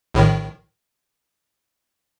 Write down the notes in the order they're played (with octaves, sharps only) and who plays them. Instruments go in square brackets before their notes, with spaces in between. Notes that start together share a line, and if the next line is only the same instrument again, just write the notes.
[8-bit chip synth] A#1 A2 D#3